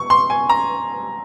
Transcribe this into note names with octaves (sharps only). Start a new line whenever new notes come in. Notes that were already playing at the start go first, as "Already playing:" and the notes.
Already playing: C#6
C6
G#5
A#5